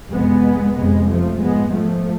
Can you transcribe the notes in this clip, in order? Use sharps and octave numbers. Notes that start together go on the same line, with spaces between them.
F2 C3 G#3 B3
F2 C3 G#3 B3
F3 A3
G#2 G#3 B3
F3 A3